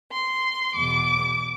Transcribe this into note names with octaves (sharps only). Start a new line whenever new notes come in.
C6
E2 B2 D6